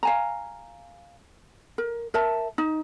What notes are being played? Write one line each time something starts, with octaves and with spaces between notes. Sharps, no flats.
F5 G#5 A#5
A#4
A#4 E5 A5
D#4